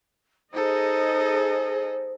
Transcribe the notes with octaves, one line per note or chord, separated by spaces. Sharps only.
D#4 G#4 A4 C5 D#5